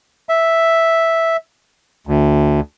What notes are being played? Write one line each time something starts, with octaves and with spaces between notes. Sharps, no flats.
E5
D2